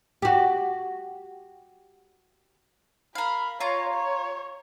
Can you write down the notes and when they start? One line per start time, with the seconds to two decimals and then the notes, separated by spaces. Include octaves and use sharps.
0.22 F#4 G4
3.15 A#4 F5 B5
3.60 F4 C#5 A#5
3.93 C#5